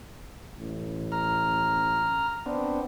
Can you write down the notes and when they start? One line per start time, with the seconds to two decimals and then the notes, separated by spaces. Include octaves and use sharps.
0.57 A1
1.12 A#5 F6
2.46 B3 C4 D4